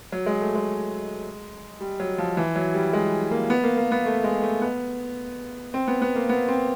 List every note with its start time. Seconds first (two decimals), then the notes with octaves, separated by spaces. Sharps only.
0.12 F#3
0.26 G#3
0.41 A3
0.55 G#3
1.81 G3
2.00 F#3
2.18 F3
2.37 E3
2.56 F#3
2.74 G3
2.93 G#3
3.31 A#3
3.50 B3
3.63 A#3
3.77 A#3
3.91 B3
4.06 A3
4.24 G#3
4.42 A3
4.62 B3
5.74 C4
5.88 B3
6.02 B3
6.16 A#3
6.29 B3
6.48 C4